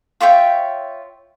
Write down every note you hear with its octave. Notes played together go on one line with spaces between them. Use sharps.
F4 C#5 E5 G5